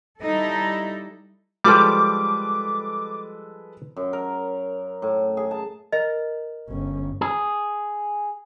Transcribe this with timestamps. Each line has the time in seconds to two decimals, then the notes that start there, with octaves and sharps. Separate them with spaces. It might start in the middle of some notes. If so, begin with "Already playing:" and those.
0.21 G3 D#4 E4 A4
1.64 F3 G3 G#3 A4 B4 D6
3.96 F#2
4.13 A#4
5.02 A2
5.37 G#4
5.51 A5
5.92 A#4 D#5
6.68 G1 C#4
7.21 G#4